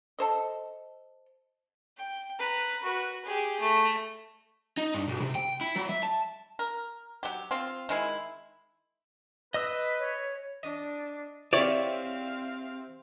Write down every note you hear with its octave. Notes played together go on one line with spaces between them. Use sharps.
A4 C5 D#5
G5
B4 A#5
F#4 B4
G4 G#4
A3
D#4
G2
B1
C3
G5
E4
F#3
E5
A5
A#4
F#3 G4
C4 F4
D#3 G#3 E4
B4 D#5 D#6 E6
C#5
D4 D#5
C3 C4 E4 C#5 D5 F5